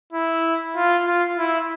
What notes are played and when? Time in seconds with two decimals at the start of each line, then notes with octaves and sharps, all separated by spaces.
0.12 E4
0.76 F4
1.06 F4
1.37 E4